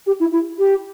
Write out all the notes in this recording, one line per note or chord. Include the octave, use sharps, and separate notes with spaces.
G4
E4
E4
G4